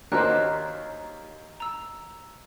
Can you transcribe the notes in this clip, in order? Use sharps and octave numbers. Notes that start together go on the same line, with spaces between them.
D#2 C#4 D4 F#4 A#4 C5 D#5 F#6
A#5 E6